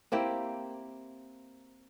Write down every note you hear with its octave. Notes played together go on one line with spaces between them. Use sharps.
A#3 C4 E4 G4